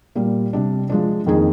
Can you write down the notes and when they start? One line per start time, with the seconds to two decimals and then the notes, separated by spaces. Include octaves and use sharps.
0.15 A#2 G3 A#3
0.53 C3 G3 D4
0.90 F3 G#3 D4
1.26 F2 D#3 A#3 D#4 G#4